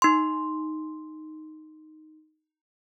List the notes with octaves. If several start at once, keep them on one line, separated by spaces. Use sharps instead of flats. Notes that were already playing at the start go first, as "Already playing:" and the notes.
D#4 C6